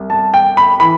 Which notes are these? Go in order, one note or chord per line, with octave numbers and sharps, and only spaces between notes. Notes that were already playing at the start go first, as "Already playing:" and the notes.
Already playing: C2
A5
G5
B5
E3 B5